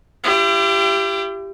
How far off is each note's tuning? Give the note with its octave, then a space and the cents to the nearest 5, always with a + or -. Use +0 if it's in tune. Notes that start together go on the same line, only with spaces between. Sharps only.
E4 +45 G4 +0